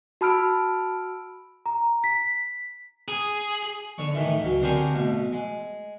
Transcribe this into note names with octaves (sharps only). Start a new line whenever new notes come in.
F#4 A5 B5 E6 F6 D7
A#5
B6
G#4
D3 C#5 C#6
A2 D#3 E3
C#2 F#3
D3 C4 G4 G#4 A#4 C#5
A1 B2
G#3